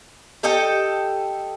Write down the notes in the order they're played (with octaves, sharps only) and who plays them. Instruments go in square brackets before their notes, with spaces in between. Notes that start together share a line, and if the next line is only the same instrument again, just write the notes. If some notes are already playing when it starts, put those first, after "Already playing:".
[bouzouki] G4 A4 D#5 G5